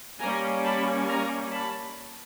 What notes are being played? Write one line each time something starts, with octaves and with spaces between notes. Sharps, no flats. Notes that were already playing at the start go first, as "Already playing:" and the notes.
G3 A#3 C#4 G#5 A#5
A5 B5
G#5 A#5
A5 B5